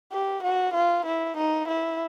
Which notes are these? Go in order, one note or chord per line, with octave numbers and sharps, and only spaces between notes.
G4
F#4
F4
E4
D#4
E4